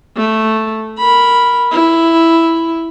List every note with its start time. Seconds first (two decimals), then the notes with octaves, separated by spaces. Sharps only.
0.17 A3
0.98 A#4 B5
1.71 E4